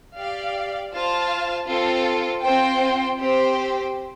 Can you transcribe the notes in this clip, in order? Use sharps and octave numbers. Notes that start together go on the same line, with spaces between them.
G4 D5 F5
F4 C5 F5 A5
C4 F4 A4
C4 F4 C5 G5
C4 G4 C5